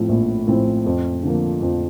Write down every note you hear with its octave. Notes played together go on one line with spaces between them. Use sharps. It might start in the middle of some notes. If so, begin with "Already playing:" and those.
Already playing: A2 F3 C4 E4
A#1
A2 F3 C4 E4
F2
D3 F3 A#3
F2